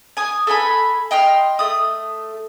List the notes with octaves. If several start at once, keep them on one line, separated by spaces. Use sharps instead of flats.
G#5 D#6
A4 B4 G#5 B5
D#5 G5 C6 F6
A3 D#6